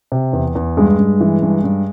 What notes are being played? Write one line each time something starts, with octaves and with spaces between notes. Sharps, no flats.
C3
E2
E2
G2 G#3
G2
E3
G2
G2